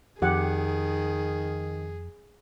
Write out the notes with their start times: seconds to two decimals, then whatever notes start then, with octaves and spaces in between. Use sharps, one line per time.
0.22 F2 D#3 G4 G#4 F#5